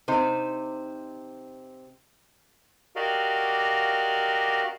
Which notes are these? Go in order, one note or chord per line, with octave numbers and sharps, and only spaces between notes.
C3 D#4 C5
F#4 G4 A#4 D5 D#5 F5